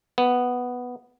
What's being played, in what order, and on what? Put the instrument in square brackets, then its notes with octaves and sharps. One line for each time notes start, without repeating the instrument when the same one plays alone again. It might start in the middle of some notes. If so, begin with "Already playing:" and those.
[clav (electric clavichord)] B3